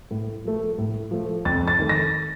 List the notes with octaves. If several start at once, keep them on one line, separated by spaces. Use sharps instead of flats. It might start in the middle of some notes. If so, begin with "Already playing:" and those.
A2
F3 A3
A2
F3 A3
F2 A6
A6
D#3 A3
A#6